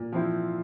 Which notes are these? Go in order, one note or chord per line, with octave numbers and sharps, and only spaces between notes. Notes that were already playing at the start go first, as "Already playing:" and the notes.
Already playing: A#2
F3 C4 E4